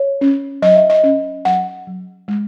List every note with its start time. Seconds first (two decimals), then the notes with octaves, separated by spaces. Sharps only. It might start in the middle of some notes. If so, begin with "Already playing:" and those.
Already playing: C#5
0.21 C#4
0.62 F#3 D#5
0.75 E5
0.90 D#5
1.04 C#4
1.45 F#3 F#5
1.87 F#3
2.28 G#3